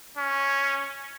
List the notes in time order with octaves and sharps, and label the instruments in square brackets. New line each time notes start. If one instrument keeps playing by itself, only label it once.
[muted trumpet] C#4